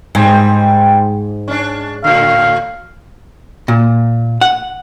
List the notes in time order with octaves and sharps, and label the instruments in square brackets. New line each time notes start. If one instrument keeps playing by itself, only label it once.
[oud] G#2 [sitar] G3 C4
[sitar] C#4 D4
[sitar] A2 D3 [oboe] F5
[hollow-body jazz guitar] A#2
F#5